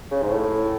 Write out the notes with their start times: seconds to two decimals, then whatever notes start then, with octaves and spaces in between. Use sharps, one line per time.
0.11 C#3
0.22 G#2
0.30 A2